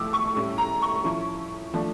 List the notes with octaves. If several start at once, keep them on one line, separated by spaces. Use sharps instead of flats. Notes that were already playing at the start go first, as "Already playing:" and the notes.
Already playing: A2 F3 A3 D6 E6
C#6
A2 G3 C#4 E4
A#5
C#6
F3 C#4 E4
F3 A3 D4